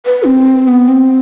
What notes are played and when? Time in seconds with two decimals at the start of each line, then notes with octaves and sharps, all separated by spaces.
0.06 B4
0.26 C4
0.68 B3
0.88 C4